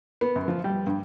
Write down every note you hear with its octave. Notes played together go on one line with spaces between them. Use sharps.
B3
F#2
F3
G3
G2